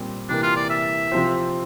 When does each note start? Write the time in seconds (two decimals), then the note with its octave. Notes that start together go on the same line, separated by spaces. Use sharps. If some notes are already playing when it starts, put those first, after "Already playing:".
Already playing: A#2 G3 C4
0.29 C3 E3 A#3 D4
0.43 F4
0.56 D5
0.70 E5
1.12 C3 F3 C4 F4 C5